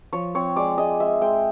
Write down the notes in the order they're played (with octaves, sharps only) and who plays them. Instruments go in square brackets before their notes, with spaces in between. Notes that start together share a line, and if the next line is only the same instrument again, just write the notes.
[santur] F3 C#5
C4 C#5
G#3 D5
G#3 D#5
G#3 E5
G#3 G5